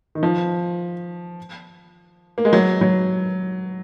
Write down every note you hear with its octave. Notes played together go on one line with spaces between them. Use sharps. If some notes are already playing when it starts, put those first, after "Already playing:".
D#3
F3
A#3
G#3
F#3
F#3